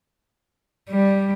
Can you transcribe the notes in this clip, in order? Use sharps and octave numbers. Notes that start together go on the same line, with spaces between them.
G3